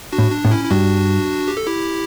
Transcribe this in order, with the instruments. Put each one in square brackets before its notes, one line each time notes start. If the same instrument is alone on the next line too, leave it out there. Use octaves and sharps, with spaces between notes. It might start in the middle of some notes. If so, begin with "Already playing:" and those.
[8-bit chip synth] D4 F#4
[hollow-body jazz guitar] A2
[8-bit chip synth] D4
[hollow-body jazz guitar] A2
[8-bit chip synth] C#4 E4
E4
[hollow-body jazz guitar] G2 [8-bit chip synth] D4 F#4
[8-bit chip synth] G4
A4
E4 G4